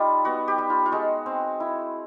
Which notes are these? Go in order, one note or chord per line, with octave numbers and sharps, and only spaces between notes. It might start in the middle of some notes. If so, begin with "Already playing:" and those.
Already playing: G3 D#4 F4
B3 F#4
G4
G3
F4
F4
G#3 F#4
C4
E4